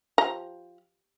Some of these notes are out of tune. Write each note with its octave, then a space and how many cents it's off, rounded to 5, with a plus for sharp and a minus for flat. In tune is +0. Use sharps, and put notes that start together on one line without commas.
F3 +5 G4 +0 A#5 +0